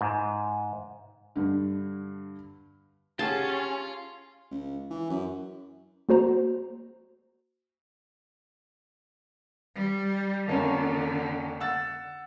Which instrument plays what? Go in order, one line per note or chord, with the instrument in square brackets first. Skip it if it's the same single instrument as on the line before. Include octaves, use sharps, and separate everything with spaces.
[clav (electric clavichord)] G#2
[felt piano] G2 D3
[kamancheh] C#4 [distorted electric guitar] F4 [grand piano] G4 G#4 F#5 [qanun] A5
[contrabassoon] C#2
E3
F#2
[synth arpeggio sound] A#3 F#4 C5 A#5
[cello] G3
[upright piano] F2 A#3 C#4 [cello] D3
[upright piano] F#5 E6 A6